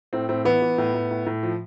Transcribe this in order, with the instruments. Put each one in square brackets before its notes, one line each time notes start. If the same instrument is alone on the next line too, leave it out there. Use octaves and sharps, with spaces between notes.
[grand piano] A2 C4
A2 C4
E3 B3
E3
A2
A2
A2
A2
F3